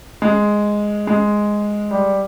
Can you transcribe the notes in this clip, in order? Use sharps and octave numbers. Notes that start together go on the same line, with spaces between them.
G#3
G#3
G3